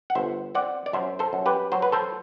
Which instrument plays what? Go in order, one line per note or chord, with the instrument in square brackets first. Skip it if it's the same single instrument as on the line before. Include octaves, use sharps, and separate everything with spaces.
[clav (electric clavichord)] F#5
G1 C5 E5
C4 D5 F#5
D5
F#2 C5 E5
A4 C5
F#2
G4 B4
F#3 C5
B4
A4 C5